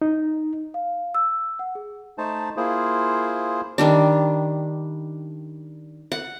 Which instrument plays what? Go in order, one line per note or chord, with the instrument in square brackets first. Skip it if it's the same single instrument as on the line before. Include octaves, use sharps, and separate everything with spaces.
[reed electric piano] D#4
[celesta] F5
E6
F#5
G#4
[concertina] A3 D#4 C5 A5
A#3 E4 F4 G#4 C5
[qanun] D#3 G3 D4
F#5